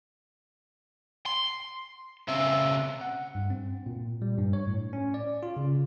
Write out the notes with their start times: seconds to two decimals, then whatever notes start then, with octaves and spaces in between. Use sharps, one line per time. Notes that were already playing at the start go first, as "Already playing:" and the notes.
1.26 C6
2.28 C#3 C4 E5
3.01 F#5
3.35 G2
3.50 C4
3.86 A#2
4.22 G3
4.38 G2
4.53 C#5
4.67 A2
4.93 C#4
5.14 D5
5.43 F4
5.57 C#3